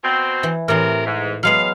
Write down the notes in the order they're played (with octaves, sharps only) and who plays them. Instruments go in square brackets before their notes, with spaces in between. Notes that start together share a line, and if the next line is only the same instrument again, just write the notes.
[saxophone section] B2 C4
[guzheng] E3
[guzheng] A2 E3 [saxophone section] C3 A#4
[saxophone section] G#2
[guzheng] F#3 G#3 B3 [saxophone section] F5